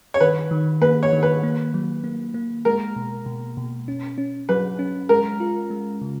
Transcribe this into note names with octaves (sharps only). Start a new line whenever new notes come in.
C#5
D#3 B4
D#3
A#3 B4
C#5
D#3
B4
A#3
F#3
A#3
A#3
G#3 A#4
B2
B2
B2
C#4
C#4
F#3 B4
C#4
G#3 A#4
F4
G#3
C#3